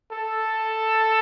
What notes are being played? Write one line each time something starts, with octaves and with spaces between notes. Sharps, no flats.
A4